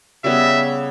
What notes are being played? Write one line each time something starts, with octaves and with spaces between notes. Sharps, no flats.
C#3 G3 B3 E5